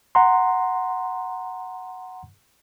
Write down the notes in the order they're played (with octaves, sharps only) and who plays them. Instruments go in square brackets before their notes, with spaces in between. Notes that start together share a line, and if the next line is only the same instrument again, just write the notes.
[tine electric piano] F#5 A#5 C6